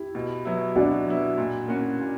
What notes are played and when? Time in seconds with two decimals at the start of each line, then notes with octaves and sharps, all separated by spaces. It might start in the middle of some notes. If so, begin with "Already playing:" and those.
Already playing: E4 G4
0.15 B2
0.45 F#3 B3 E4
0.76 B2 D4 F#4
1.07 F#3 B3 E4
1.38 A#2
1.68 A#3 C#4 F#4
1.99 A#2